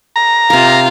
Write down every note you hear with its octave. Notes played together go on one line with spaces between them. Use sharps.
A#5
C3 F4 A#4 F5